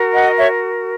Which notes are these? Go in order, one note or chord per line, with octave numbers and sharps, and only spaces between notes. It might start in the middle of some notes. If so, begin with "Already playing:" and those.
Already playing: F#4 A#4
D#5 F#5
C#5 E5